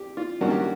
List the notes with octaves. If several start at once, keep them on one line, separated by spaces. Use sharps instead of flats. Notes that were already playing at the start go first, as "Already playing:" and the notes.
Already playing: G4
F4
G2 D#3 F#3 A#3 C#4 F#4
G4
F#4